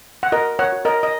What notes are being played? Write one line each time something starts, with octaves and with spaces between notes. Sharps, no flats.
F#5
F#4 A#4 D#5
C#5 F#5
F#4
A#4 D#5
D#5